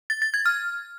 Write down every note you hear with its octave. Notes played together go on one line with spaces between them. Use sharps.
A6
A6
G#6
F6